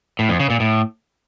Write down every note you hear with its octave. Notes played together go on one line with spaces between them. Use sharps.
A2
F2
C#3
A#2
A2